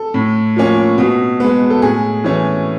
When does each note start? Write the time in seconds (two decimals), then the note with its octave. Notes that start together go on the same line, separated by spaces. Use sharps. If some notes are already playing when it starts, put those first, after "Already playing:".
Already playing: A4
0.14 A2
0.56 F3 A#3 C#4
0.98 B2
1.40 G#3 B3
1.70 A4
1.82 A2 G#4
2.24 E3 A3 C#4